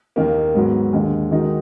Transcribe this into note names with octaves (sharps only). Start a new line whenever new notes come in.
D#2 D#3 A#3
G#2 F#3 B3
D#2 D3 G#3
D#3 G#3 D#4 F#4